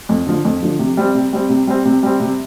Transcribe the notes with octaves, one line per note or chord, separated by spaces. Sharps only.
F2
D3 F3
F2
D3 F3
C3
G3 C4
C3
G3 C4
C3
G3 C4
C3
G3 C4
C3